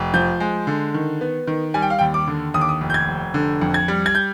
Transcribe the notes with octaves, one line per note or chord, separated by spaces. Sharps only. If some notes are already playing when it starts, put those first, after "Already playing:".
Already playing: F1
F3 G6
G#3
D3
D#3
B3
D#3
G3 G#5
G5
F5
D#2 G5
D6
D3
D#2 D#6
D6
D#6
F1
G6
G#6
F1
D3
F2
G#6
G3
G#6
G6